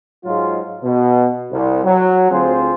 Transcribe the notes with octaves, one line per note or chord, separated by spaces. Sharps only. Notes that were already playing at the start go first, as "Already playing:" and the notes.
G#2 F#3 G#3 F4
B2
C2
F#3
D2 C4 F4 G#4 C5